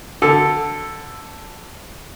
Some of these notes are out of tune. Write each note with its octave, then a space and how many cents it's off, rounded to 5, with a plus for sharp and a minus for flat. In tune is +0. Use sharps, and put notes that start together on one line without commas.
D3 +0 A4 +0